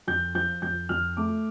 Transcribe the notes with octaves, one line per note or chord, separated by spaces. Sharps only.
F2 G6
F3 G6
F2 G6
F2 F6
A3 D6